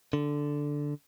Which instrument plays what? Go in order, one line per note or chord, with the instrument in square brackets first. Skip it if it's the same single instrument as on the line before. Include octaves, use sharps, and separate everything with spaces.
[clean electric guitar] D3